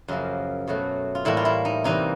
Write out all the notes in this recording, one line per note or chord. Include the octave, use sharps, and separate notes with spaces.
F#2 C#3 F3 A#3
B2 F#3 A3
F4
A2 E3 G3 A#3 E4
F4
E4
D#4
C3 E3 G3 A#3 D#4